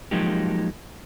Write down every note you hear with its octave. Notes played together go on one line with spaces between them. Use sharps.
F3 F#3 G#3 A#3 D#4 G4